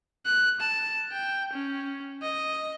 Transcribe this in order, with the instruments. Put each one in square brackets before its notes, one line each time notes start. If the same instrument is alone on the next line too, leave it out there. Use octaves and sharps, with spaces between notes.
[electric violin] F#6
A5
G5
C#4
D#5